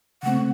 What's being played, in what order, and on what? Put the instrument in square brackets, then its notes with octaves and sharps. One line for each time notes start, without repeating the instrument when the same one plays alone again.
[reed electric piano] C#3 A3 C4 [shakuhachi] F#5